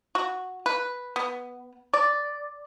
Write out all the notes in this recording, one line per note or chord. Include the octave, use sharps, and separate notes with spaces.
F#4
B4
B3
D5